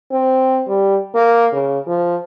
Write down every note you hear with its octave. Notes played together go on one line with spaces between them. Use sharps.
C4
G3
A#3
C#3
F3